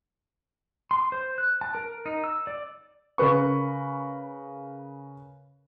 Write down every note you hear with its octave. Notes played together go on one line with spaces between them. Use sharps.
C6
C5
F#6
A5
A#4
D#4
E6
D5
C#3 A#4 B4 C#6